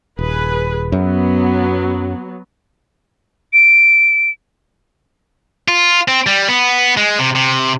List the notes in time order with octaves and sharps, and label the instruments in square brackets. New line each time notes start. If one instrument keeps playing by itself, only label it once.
[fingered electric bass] D#1 [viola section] G#4 B4
[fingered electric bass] F#2 [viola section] F#3 B3
[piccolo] D7
[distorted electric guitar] F4
C4
G3
B3
G#3
C3
C3